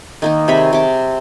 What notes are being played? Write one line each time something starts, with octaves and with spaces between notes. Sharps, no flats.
D#3 A#3 D#4
C3 G#4 C#5 B5
C3 D6